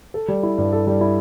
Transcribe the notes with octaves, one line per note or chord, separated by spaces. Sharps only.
A4
G3
E4
G2
A4
G3
E4